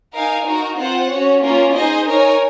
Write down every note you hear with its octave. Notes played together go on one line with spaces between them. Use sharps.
D#4 A#4 F5 G#5
D#4 F#4 A#4
C4 F4 C5 F#5
C#4 F#4 C#5
A#3 C#4 F4 A#4
D#4 G#4 C5 D#5 G#5
D#4 A#4 C#5 G#5